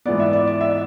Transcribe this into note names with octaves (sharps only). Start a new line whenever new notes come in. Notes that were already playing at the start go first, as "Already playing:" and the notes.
G#2 E3 B3 D5
E5
D5
D5
E5